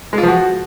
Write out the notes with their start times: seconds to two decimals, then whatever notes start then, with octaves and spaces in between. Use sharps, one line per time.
0.13 G#3
0.18 F4
0.23 F3
0.28 F#4